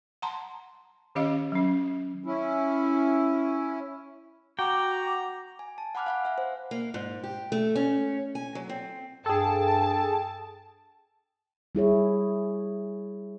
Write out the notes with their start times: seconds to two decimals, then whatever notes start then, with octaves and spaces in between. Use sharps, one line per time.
0.22 F#5 A5 A#5 C6
1.15 D#3 C#4 G4 D#5 F5
1.52 F#3 C#4
2.24 C#4 E4
4.59 F#4 G5 A#5 D6
5.59 G#5
5.78 A5
5.95 F#5 G#5 B5 D6 F6 F#6
6.06 F5 F#5 B5
6.25 E5 F#5
6.38 C5
6.71 A#3
6.94 G#2
7.24 G4
7.52 A3
7.75 C#4
8.35 G#5
8.55 F#3
8.69 C4
9.26 G2 G#4 A4 G5 A5
11.75 G3 E4 G#4 C#5